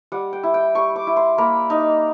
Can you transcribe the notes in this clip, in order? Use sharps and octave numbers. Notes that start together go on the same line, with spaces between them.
G3 F#5
G5
E4
G5
G3 C#6
D6
E4
C6
A#3 B5
D#4